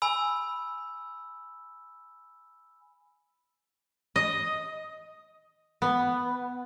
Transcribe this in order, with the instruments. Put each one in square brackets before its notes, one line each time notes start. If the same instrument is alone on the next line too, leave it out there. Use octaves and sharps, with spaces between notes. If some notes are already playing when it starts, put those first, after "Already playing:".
[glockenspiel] G#5 B5 E6
[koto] D#5
B3